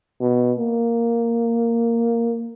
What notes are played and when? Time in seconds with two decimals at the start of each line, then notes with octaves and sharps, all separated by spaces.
0.21 B2
0.59 A#3